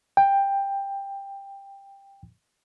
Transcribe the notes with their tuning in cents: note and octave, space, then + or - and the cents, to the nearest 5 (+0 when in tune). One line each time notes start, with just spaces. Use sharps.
G5 +15